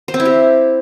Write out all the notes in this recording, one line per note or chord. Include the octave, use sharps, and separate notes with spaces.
C5
C4
E4
G4